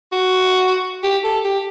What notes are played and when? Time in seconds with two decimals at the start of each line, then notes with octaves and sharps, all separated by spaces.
0.12 F#4
1.03 G4
1.24 A4
1.44 G4